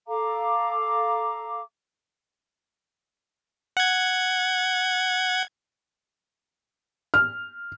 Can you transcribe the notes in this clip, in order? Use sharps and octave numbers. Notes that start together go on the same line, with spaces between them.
A4 F5 A#5 D6
F#5 G#6
F6